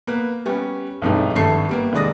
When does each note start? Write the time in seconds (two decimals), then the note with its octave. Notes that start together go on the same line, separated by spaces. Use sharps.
0.07 A#3 B3 B4
0.45 G3 B3 C#4
1.02 B1 F2 G#2 E3 G3 A3
1.35 G#1 G2 A3 A4 C#6 C7
1.69 G3 A#3 B3
1.93 F1 D#2 G#3 D5 D#6 A#6